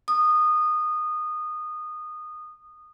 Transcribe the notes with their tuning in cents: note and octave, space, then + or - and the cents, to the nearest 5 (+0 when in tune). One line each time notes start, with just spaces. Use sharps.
D#6 -20